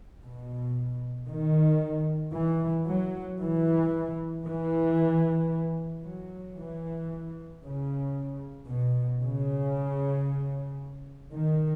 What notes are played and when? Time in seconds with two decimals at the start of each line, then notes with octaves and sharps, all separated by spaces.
0.22 B2
1.28 D#3
2.33 E3
2.87 F#3
3.39 E3
4.45 E3
6.04 F#3
6.56 E3
7.62 C#3
8.68 B2
9.22 C#3
11.33 D#3